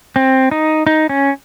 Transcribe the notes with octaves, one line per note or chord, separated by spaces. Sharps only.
C4
D#4
D#4
C#4